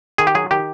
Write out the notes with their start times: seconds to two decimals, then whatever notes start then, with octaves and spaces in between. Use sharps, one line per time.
0.18 D#3 G#4
0.27 G4
0.35 F#3 G#4
0.51 D#3 G4